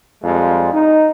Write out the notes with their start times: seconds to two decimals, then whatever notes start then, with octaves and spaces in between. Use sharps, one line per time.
0.23 F2 F3 G3 G#3
0.73 D#4